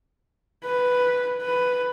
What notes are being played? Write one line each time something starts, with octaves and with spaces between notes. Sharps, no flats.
B4
B4